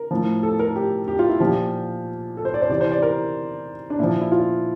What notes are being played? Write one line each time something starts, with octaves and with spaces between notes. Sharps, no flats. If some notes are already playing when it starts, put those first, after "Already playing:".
Already playing: A#4
A2 F3
A4
A#4
G4
G4
F4
E4
A#2 F3 G4
A4
C5
D5
C5
C3 E3 D5
C5
D5
A#4
D4
A#2 F3 E4
E4
F4